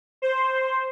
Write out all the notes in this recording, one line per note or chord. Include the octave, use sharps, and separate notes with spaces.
C5